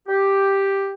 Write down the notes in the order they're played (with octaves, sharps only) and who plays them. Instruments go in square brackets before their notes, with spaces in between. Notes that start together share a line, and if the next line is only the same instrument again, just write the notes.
[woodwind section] G4